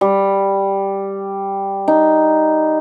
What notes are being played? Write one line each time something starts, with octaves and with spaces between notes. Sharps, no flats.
G3
D#4